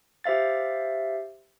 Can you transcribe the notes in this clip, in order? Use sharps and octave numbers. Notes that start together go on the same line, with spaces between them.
G4 C5 E5 F5 A6